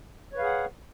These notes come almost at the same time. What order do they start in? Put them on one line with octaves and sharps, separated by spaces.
C#5 B4 F5 G#4 F#5